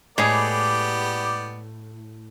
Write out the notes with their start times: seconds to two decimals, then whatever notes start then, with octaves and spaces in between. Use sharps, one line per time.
0.18 A2 G#3 B3 G4 G#4 D5